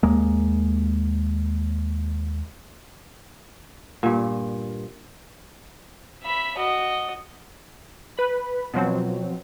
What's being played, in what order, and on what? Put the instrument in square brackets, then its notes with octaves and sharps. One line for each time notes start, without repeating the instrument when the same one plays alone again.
[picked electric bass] D#2 G#3 A#3
[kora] G2 A#2
[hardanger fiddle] E5 B5
F#4 D#5
[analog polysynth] B4 B5
B2 F3 F#3 C4